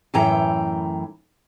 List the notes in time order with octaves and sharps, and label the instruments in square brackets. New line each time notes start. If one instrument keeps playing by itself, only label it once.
[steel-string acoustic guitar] F#2 A2 E3 G5 A#5